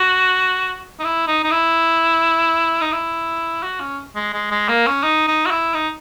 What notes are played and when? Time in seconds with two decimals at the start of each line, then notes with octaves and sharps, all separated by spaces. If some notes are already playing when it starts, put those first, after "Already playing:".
Already playing: F#4
1.00 D#4
1.04 E4
1.27 D#4
1.44 D#4
1.51 E4
2.81 D#4
2.92 E4
3.63 F#4
3.80 C#4
4.16 G#3
4.33 G#3
4.51 G#3
4.69 A#3
4.87 C#4
5.03 D#4
5.28 D#4
5.46 F#4
5.50 E4
5.74 D#4